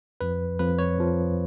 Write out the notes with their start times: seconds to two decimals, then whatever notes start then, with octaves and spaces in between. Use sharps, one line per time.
0.21 F2 F3 B4
0.59 F2 F3 B4
0.79 C#5
0.98 F2 F3